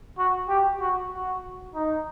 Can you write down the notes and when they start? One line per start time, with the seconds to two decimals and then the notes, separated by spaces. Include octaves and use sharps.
0.18 F#4
0.49 G4
0.80 F#4
1.13 F#4
1.75 D#4